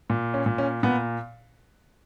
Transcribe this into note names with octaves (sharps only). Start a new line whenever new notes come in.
A#2
C#4
A#2
C#4
A#2 B3